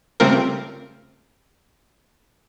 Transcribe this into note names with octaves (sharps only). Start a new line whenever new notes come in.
C#3 G3 A3 C4 F4 A#4